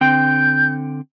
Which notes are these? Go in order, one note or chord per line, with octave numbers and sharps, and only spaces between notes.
D3 C4 G5 G6